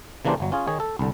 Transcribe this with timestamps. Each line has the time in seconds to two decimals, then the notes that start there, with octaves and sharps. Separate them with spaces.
0.25 C#3 E3 A#3 D4 G4 C5
0.40 G1 F#3
0.52 C#4 F4 G#4
0.68 D#3 G#4 C#5
0.80 A4
0.99 C2 D3